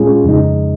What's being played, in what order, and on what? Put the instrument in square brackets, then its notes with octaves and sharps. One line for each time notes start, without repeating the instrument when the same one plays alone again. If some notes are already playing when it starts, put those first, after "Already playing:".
Already playing: [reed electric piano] A#2 G#3 C#4 F4 G#4
F2 C#3 G#3 D#4